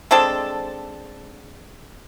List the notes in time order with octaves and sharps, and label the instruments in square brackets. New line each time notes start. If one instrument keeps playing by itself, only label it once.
[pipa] G#3 C4 D4 A4